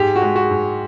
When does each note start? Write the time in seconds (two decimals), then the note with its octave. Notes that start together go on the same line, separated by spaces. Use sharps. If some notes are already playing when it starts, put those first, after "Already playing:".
Already playing: G#2 G4
0.16 F#4
0.22 G#3
0.36 F#4
0.51 G#2